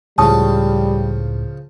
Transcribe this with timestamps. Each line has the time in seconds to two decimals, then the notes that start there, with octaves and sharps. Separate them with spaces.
0.18 C#2 A2 C#3 F3 G3 A5 C#6 D#6